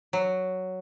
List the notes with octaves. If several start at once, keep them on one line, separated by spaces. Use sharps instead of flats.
F#3